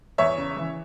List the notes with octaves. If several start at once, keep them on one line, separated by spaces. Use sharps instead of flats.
E2 C#5 E5
C#3
E3